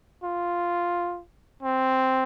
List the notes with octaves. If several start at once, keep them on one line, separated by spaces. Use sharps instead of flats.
F4
C4